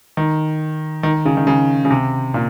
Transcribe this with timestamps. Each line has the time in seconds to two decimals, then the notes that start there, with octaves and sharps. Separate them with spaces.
0.17 D#3
1.03 D#3
1.25 C#3
1.37 D#3
1.47 C#3
1.85 C#3
1.90 C3
2.34 A#2